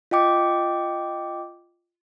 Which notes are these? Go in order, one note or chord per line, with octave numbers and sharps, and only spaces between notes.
F4 D#5 G5 D6